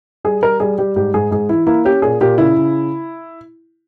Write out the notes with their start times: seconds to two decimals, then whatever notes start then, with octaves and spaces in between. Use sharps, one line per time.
0.24 G3 G#4
0.42 G3 A#4
0.60 G3 G#4
0.78 G3 G4
0.96 G#2 G4
1.14 G#2 G#4
1.31 G#2 G#4
1.49 E3 E4
1.67 A#3 E4
1.85 C#4 G4
2.02 A#2 G#4
2.21 A#2 G4
2.38 C#3 E4
2.57 C#3